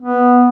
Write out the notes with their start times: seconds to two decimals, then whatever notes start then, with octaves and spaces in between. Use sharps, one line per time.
0.02 B3